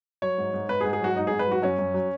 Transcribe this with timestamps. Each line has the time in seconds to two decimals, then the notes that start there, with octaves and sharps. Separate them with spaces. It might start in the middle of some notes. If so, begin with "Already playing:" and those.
0.22 F#3 C#5
0.38 G#2
0.54 G#2
0.69 G#2 B4
0.81 G#4
0.85 G#2
0.93 G#4
1.01 F#3 F#4
1.16 G#2 D#4
1.27 G#2 G#4
1.39 B4
1.47 F#3 F#4
1.62 F#2 C#4
1.79 F#2
1.94 F#3